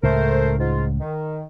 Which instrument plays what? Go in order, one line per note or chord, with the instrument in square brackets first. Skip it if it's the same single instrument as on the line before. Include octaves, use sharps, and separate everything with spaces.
[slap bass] C#2 A2 C#3 [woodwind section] A3 A#4 C5
[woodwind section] G#2 F4
D#3